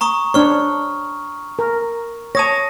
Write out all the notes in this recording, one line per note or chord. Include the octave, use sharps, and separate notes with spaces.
A#5 C#6 D#6
D4 C5 C#5 C#6 F6
A#4
C#5 A5 D#6 A#6